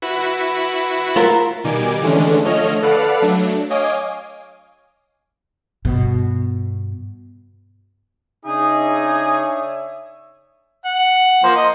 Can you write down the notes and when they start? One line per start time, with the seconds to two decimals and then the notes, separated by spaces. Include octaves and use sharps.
0.02 E4 F#4 B4
1.16 F4 A#4
1.64 B2 D#3 G3 G#5 D6
2.01 D3 E3 G#3 A3 C#4 D4
2.45 D3 F3 A3 C#5 D#5 F6
2.82 A4 B4 D5 F5 F#5
3.22 F#3 A3 D4
3.70 C#5 D#5 F5 G#5 D6 D#6
5.85 G2 B2
8.46 C#3 D4 D#4 G#4 C#5 D5 E5
10.85 F#5
11.44 F3 A#3 C5
11.55 D#5